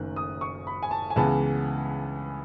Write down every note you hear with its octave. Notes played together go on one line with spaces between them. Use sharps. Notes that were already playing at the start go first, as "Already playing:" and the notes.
Already playing: F#1 F#2 D#3 A3 F#6
D#6
C#6
B5
G#5
A5
G#5
C#2 C#3 E3 G#3 B3 A5